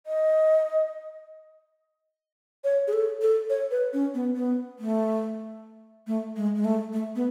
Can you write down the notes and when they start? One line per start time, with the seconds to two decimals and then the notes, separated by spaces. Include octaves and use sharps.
0.06 D#5
2.64 C#5
2.87 G#4
2.93 A4
3.22 A4
3.50 C#5
3.71 B4
3.93 C#4
4.14 B3
4.36 B3
4.79 A3
6.07 A3
6.37 G#3
6.55 G#3
6.65 A3
6.93 A3
7.15 B3